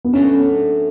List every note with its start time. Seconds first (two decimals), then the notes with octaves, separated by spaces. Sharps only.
0.05 B3
0.13 A2 F#3 A3 C#4 D4